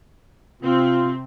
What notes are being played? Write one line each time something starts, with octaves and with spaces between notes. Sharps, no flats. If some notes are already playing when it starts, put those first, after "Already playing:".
C3 C4 F4